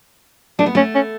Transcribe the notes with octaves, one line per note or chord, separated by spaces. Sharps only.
A3 D4
B3
A3 C#4
C#4